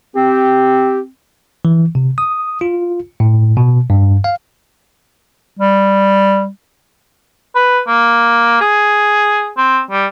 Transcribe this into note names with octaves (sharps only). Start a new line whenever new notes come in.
C4 G4
E3
C3
D#6
F4
A2
B2
G2
F5
G3
B4
A#3
G#4
C4
G3